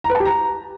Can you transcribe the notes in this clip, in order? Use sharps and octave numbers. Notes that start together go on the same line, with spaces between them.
A#5
B4
A5
G4
A#5